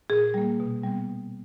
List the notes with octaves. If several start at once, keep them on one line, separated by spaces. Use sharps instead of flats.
A#2 G#4
G3 A#3
B2
G3 B3
B2